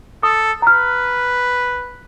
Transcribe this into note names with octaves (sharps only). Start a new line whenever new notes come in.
A4 D#6
B4 A#5 F6